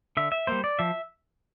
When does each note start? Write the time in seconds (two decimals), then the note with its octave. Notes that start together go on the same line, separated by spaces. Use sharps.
0.17 D3 E5
0.32 E5
0.47 G3 A#3 C5
0.64 D5
0.79 F3 E5